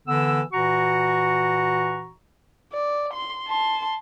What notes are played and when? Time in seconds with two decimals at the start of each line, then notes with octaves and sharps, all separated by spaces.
0.08 D3 E3 B3 E6
0.53 A#2 E3 F#4 A#5 C#6
2.73 D5
3.13 C6
3.48 A5 C6